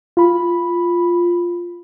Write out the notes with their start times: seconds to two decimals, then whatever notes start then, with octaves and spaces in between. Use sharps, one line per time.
0.17 F4 B5